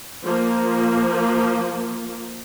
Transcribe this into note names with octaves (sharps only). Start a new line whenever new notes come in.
F3 A#3